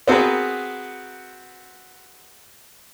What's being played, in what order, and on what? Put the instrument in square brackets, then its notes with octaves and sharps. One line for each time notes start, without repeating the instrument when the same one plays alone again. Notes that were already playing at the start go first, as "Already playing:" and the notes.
[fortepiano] B3 C4 F#4 G#4 A#4 B4